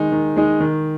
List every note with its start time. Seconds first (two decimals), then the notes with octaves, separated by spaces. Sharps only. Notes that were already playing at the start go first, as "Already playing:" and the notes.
Already playing: D#3 G#3 D#4
0.12 D#3
0.36 G#3 D#4
0.60 D#3